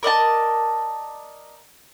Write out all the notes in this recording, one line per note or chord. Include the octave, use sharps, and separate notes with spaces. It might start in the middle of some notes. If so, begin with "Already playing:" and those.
A#4 D5 D#5 A5